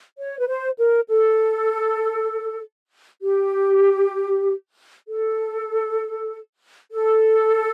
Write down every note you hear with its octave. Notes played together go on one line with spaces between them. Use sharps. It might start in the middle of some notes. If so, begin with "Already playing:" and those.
C#5
B4
C5
A#4
A4
G4
A4
A4